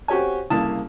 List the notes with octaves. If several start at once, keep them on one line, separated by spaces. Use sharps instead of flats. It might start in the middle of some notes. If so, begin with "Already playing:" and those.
C4 F#4 G4 C#5 G#5
C2 C#3 A#3 E4 A5 D#6